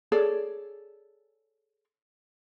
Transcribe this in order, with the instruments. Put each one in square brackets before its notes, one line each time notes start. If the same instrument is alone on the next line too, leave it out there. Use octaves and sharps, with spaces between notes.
[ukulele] G#4 A4 C#5 D5